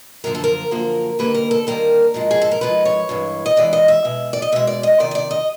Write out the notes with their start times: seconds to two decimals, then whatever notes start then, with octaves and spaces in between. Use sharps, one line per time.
0.24 F#2 D3 F3 A#3 A#4
0.35 A4
0.44 A#4
0.71 F#2 D3 F3 A#3
1.19 D#2 D3 G3 A#3 B4
1.34 A#4
1.51 A4
1.67 D#2 D3 G3 A#3 A#4
2.14 G#2 F3 G#3
2.31 G#4
2.42 A4
2.51 A#4
2.61 G#2 F3 G#3 B4
2.85 C#5
3.09 G2 E3 G#3
3.46 D#5
3.56 G2 E3 G#3 D5
3.73 D#5
3.88 E5
4.05 B2 G#3
4.33 D5
4.42 D#5
4.52 B2 G#3 E5
4.67 D5
4.83 D#5
5.00 F2 C3 D#3 D5
5.11 D#5
5.15 D5
5.31 D#5